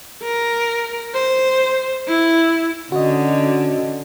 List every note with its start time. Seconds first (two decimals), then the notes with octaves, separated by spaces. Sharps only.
0.23 A#4
1.14 C5
2.08 E4
2.92 D3 C#4 F#4 D#5